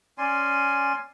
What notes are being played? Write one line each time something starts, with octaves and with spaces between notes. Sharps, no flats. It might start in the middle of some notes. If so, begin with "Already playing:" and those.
C#4 D5 G#5 C6